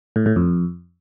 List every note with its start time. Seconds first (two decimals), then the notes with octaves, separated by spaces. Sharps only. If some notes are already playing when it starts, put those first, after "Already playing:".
0.16 A2
0.26 A2
0.36 F2